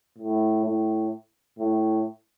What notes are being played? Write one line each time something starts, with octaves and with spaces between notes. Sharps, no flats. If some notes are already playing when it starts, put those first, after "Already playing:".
A2
A2
A2